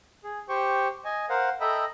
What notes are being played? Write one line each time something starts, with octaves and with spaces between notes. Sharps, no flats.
G#4
G4 C5 G5 C#6
D#5 G#5
A#4 C5 F5 F#5
A4 D#5 E5 G5 A#5 B5